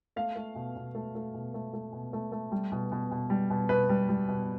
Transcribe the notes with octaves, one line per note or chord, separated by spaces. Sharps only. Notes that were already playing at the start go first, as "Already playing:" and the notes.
A3 F5
A3
B2
B2
A3
A3
B2
A3
A3
B2
A3
A3
G3
B2
B2
B2
G3
B2
B2 B4
G3
G3
B2